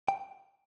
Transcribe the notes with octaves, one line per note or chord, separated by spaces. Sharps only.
G5